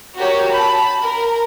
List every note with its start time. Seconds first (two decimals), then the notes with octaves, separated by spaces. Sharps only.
0.16 F#4 G4 A#4 C#5
0.52 A5 B5
1.01 A#4